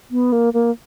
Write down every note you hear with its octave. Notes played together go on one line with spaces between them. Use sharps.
B3
A#3
A#3